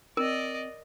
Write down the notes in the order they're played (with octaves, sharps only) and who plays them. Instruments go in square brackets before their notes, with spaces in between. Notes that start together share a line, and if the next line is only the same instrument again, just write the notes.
[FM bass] C4 [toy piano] A#4 [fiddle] D5 D#5